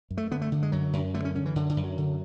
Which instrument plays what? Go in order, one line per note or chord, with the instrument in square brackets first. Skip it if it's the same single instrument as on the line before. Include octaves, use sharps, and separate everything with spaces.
[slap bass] F#2
A3
D3 B3
A3
D3
G#3
F#2 F#3
F#2
D3 A3
C#4
D3 C#4
E3
F#2 D3
D3
F#2
F#3
D3